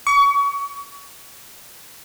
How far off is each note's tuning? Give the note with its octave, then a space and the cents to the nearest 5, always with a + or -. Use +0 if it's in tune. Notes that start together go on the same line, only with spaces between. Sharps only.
C#6 +35